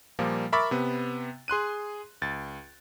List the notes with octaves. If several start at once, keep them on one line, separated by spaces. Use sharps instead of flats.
A#2 F3 G3 A#3
A#4 E5 B5 C#6 D6 A6
C3 B3
G#4 C6 F#6 D#7
C#2 A6